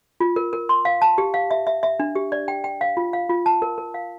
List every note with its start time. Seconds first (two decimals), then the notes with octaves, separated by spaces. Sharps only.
0.20 F4
0.36 A#4
0.53 A#4
0.69 C6
0.85 F5
1.02 A5
1.18 G4
1.34 F5
1.51 E5
1.67 E5
1.83 E5
2.00 D4
2.15 G4
2.32 D5
2.48 G5
2.64 G5
2.81 F5
2.97 F4
3.13 F5
3.29 F4
3.46 A5
3.62 A#4
3.78 A#4
3.94 F5